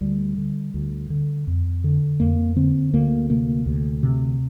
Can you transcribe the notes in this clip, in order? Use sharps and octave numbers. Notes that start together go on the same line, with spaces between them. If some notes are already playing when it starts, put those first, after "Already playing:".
D2 G3
D3
D2
D3
F2
D3
F2 A#3
D3 C4
D2 A#3
C3 A#3
D2
C3